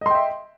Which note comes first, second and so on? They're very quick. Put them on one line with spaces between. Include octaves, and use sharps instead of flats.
D#5 C6 G5 E5